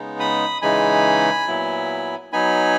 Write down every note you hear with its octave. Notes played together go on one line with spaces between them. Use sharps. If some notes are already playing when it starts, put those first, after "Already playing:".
Already playing: C#3 G#3 B3 D#4
B5 D#6
C#3 E3 G#3 D#4 G#5 B5
A#2 F#3 B3 E4
F#3 B3 D#4 G#5 B5